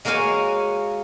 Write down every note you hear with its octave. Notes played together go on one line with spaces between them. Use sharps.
G#3 A#3 F#4 C#5 F5 G#5